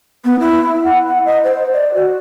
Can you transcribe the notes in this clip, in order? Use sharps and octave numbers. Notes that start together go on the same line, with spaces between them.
B3
E4
F#5
F#5
D#5
C5
D5
F#4